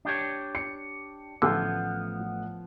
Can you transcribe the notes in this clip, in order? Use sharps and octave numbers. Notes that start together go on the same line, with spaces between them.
D4 G4 C#5
C#7
A1 D3 F3 A3 B3 F#5